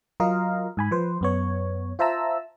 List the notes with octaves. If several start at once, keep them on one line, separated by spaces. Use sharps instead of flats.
F#3 F4 A#4 D#5 F5
G#2 G#5 B5
F3 B4 C5
F#2 B3 C#5
F4 C5 E5 A5 A#5 E6